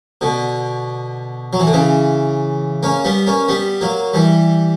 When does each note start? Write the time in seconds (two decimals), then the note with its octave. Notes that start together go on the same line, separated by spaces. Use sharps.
0.21 B2 D3
1.53 F#3
1.60 E3
1.67 D3
1.73 C#3 E3
2.83 A#3 C#4
3.05 G3 B3
3.27 A#3 C#4
3.48 G3 B3
3.81 F#3 A#3
4.13 E3 G3